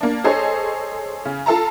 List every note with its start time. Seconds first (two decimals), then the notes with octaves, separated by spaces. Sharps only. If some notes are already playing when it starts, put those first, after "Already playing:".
0.01 A#3 D4
0.24 G#4 A4 C5 C#5 D#5
1.25 C#3
1.46 F4 A4 A5 A#5